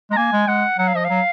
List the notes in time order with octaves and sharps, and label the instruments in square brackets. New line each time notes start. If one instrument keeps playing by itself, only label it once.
[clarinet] G#3 [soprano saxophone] A#5
[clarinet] A#3 [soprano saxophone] G#5
[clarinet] G#3
[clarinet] G#3 [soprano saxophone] F#5
[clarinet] F#3 [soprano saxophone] F#5
[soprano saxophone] F5
[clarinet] F3 [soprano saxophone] D#5
[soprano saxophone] F5
[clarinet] F#3